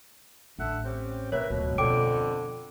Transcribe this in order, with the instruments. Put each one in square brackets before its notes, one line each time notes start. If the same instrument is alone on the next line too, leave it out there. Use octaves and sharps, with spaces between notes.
[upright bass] A1 [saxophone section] D3 E5 F#5
[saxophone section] C4 C#4 G4
[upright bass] C3 [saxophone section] A#3 B4 E5 [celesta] C#5
[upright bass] D1 F4 [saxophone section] B2
[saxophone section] F2 D3 [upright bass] B2 B3 [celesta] G5 D6 D7